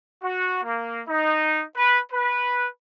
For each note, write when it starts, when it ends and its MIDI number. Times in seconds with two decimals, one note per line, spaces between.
0.23 0.62 66
0.64 1.01 58
1.08 1.63 63
1.76 1.99 71
2.12 2.67 71